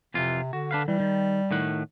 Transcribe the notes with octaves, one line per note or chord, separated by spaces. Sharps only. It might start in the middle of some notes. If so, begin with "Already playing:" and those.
F2 C3 E3 F4
D3 F#4
D4 B4 F5
E3 G3
D#3
A2 D#3 F#5